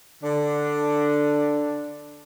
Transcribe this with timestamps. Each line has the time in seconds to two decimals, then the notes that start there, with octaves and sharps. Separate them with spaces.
0.24 D3 D4